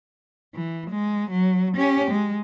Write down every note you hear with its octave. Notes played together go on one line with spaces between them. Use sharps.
E3
G#3
F#3
C#4 G4
G#3